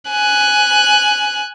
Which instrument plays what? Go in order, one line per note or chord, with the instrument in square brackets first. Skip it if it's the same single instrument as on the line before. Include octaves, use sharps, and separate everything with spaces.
[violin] G#5 F#6